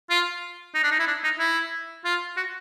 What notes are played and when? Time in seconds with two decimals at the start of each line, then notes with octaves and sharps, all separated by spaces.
0.10 F4
0.74 D#4
0.83 D4
0.91 D#4
0.99 E4
1.07 D4
1.24 D#4
1.39 E4
2.04 F4
2.36 F#4